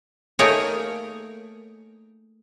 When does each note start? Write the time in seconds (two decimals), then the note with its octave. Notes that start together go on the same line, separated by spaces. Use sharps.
0.39 A3 A#3 D#4 G#4 A#4 C#5